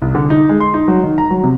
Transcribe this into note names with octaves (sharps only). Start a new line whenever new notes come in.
C2
D3
D#4
G#3
C6
D#4
F#3
D#3
A#5
F#3
C3